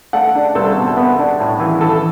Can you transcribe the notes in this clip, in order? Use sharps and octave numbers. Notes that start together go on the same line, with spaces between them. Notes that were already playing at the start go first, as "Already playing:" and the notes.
A3 F#5
D4
C2 A4
B2
B3
D4
A2
E3
E3 A4